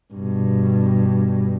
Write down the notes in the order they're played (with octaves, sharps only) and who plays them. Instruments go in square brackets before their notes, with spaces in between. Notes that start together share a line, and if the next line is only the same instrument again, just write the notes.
[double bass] G2 B2